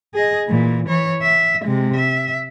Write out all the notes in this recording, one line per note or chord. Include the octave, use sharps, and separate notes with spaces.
G#4 D#5
A#2 E3
E3 C#5
E5
C3 G#3
E5